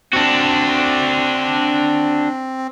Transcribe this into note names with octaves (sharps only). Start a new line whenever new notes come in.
C4 D4 F#4